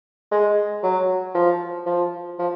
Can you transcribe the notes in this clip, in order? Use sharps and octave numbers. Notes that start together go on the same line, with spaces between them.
G#3
F#3
F3
F3
F3